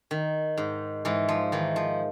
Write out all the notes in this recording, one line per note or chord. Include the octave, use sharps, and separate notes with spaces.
D#3
G#2
G#2 E3
F3
D#3 E3
F3